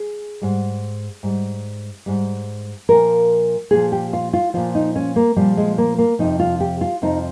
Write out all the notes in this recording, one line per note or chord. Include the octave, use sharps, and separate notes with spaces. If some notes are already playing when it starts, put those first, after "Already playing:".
Already playing: G#4
G#2 G3
G#2 G3
G#2 G3
A#2 F3 A#4
A#2 F3 G#4
G4
F4
F4
A#2 F3 F4
D#4
C#4
A#3
A#2 F3 G3
G#3
A#3
A#3
F2 C3 F3 D#4
F4
G4
F4
F2 C3 F3 D#4